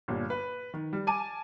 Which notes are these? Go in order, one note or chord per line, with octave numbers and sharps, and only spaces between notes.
G1 A#2 G3
B4
D#3
G3
G#5 A5 D6 D#7